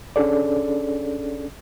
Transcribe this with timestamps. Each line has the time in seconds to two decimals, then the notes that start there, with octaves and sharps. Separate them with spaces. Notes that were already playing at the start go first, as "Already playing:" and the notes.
0.16 C#4 D4 G#4 A4 D5